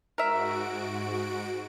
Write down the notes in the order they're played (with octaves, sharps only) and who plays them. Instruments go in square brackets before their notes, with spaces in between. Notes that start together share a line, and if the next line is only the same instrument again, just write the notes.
[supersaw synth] G#2 F#4 D7 [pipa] A#4 E5